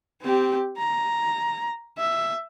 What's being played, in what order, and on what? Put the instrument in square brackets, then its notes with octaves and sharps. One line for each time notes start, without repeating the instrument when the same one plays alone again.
[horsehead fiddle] C4 G4
A#5
E5